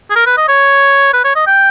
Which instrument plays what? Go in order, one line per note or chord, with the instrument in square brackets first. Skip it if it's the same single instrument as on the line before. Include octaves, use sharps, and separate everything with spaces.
[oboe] G#4
A#4
B4
D#5
C#5
B4
C#5
D#5
G5